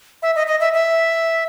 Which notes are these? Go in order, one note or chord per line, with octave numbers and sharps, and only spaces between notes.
E5
D#5
D#5
E5
E5